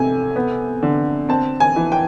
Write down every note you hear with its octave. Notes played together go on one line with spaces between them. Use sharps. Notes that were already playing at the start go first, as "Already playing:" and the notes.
Already playing: C3 A3 G#5
B3
D3
C4 A5
G#5
E3
G5